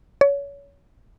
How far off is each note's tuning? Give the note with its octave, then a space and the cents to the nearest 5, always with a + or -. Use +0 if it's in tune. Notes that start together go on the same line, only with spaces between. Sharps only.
C#5 +25